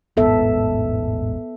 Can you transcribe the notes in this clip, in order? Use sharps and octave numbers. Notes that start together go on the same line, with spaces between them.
E1 A1 G#2 B3 A4 E5